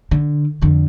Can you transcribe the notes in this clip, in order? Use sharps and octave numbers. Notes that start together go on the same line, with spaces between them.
D3
F2 D3